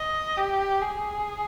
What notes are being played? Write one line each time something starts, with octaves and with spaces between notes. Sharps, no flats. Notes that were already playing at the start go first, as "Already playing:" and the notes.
Already playing: D#5
G4
G#4